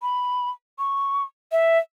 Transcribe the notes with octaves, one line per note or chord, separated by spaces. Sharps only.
B5
C#6
E5